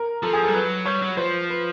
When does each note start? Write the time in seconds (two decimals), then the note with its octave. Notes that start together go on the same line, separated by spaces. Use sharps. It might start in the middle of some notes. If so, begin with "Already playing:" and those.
Already playing: A#4
0.23 F3 A4
0.33 G#4
0.43 A4
0.48 G3
0.54 F#3 B4
0.85 G3 C#5
1.02 F#3
1.17 F3 C5
1.50 B4